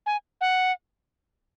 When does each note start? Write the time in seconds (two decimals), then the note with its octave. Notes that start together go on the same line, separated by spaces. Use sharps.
0.06 G#5
0.41 F#5